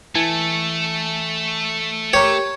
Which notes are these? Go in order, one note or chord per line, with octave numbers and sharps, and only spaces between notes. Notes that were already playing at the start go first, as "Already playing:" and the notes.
E3 A3 G#5 A5
G4 A#4 C#5